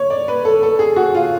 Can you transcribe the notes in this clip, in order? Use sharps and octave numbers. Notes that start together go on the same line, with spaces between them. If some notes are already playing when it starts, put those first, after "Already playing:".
Already playing: C#5
D5
B4
A4
A4
G#4
F#4
F4